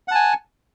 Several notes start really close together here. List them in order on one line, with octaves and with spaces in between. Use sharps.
F#5 A5 G#5